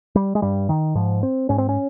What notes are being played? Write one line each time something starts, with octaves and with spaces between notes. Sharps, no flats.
G3
G#3
G2 G3
D#3
G#2 F3
C4
G#2 C#4
C4
C#4